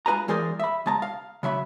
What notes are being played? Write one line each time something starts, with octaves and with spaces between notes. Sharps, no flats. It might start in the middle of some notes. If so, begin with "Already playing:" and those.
G#3 F4 B4 G#5 A#5
E3 G#3 G#4 A#4 C5 D5
E5 B5
C#2 G#3 A5 A#5
F5
C#3 F#3 E5 B5